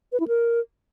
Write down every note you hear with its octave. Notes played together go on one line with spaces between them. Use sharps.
B4
E4
A#4